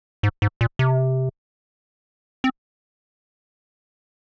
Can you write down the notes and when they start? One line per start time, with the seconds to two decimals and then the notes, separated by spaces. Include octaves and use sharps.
0.23 G#2
0.42 G#2
0.61 A#2
0.79 C3
2.44 C4